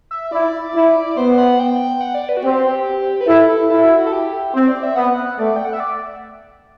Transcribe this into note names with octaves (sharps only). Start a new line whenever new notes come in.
E5
E4 D5
E4
B3 C5
F#5
G5
F#5
D5
B4
F#4
C4 G4
B4
E4 A4
A4
E4 A4
F#4
F#4
A4
G4
C4 C5
D5
E5
B3 F#5
A3 D5
G5
F#5
E5
D5